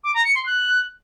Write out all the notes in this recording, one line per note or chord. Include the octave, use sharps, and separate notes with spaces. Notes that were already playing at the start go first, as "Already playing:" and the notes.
D6
A#5
C#7
C6
F#6